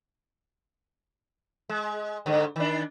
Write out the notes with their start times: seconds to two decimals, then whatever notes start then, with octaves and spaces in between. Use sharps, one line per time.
1.69 G#3
2.26 G#2 D3
2.56 D#3 D4